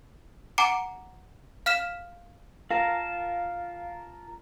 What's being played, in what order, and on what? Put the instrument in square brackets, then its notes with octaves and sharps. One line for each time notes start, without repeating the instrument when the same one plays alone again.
[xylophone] F#5 G#5 A#5 D6 C#7 D7
F5 F6 B6 E7
[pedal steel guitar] F4 A#4 A5 [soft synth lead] F5